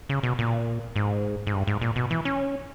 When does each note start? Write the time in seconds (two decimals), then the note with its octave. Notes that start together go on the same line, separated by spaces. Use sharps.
0.09 C#3
0.23 B2
0.39 A#2
0.96 G#2
1.47 G#2
1.53 G2
1.67 G#2
1.81 A#2
1.96 B2
2.11 E3
2.25 C#4